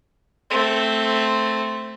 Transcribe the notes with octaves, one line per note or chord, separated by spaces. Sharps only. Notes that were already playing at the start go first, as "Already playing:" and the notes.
A3 C4